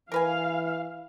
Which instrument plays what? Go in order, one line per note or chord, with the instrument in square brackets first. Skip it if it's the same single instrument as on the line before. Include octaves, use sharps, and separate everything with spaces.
[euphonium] E3 [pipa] A#4 B4 G#5 [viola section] F5